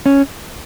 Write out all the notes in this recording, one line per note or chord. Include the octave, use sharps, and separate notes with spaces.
C#4